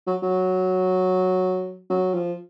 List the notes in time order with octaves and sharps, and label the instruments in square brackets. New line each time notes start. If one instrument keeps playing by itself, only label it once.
[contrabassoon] F#3
F#3
F#3
F3